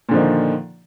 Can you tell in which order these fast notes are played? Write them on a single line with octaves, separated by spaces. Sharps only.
A#2 D3 F3 D#3